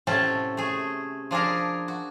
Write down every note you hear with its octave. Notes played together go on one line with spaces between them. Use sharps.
A2 C3 F#3 C#4 A4
A3 G#4
F3 D4 G#4 A#4
F#4